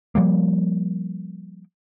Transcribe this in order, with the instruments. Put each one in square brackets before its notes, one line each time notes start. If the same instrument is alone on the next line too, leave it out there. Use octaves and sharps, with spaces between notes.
[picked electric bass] F3 G3 A#3